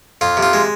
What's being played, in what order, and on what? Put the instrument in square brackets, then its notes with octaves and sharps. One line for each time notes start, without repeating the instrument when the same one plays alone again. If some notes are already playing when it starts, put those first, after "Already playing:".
[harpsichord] F2 F4
C3
F4
G#3